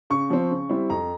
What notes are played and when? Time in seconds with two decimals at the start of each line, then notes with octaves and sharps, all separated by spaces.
0.10 C#3 C#6
0.30 F3 C4
0.51 C#3
0.69 G3 C4 E4
0.90 F2 A#5